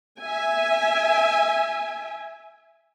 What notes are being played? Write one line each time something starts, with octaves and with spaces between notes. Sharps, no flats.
E5 G#5